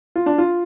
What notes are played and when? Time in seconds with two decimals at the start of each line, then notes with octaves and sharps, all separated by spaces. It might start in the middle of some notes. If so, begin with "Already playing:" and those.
0.16 F4
0.26 D4
0.38 F4